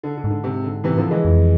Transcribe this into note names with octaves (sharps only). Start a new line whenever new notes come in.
D3
D3
G#2
D3
C3
D3
C3 E3
D3 F3
E3 G#3
F2